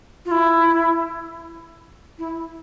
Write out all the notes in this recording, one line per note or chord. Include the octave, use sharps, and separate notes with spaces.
F4
E4
E4